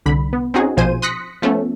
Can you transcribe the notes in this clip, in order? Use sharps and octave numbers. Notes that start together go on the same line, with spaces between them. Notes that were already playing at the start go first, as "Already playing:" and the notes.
C2 D3 B5
B3
C4 C#4 D#4 F#4 G#4
A#1 B2 F3 C5 G#5 D#7
C6 D#6 F#6 A#6 B6 C#7
F3 A3 B3 C#4 A4